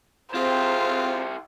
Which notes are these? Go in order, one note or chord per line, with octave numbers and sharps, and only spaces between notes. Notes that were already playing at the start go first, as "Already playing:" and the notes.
C4 E4 F4 G4 G#4 C5